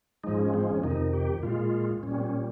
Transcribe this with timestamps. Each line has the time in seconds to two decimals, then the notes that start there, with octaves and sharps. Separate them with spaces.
0.24 G#2 F3 G#3 D#4
0.39 C#4
0.54 C4
0.69 C#4
0.84 F2 C3 D#3 D#4
1.13 G4
1.43 A#2 G#3 F4
2.03 A#2 G3 C#4
2.18 C4
2.24 C#4